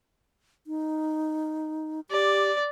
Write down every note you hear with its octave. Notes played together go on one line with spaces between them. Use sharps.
D#4
G4 D5